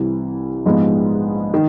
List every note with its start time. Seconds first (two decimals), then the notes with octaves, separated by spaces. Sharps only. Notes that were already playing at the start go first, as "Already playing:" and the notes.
Already playing: C2 C3 E3
0.65 A#1 G#2 F3 G#3 B3
1.54 D#3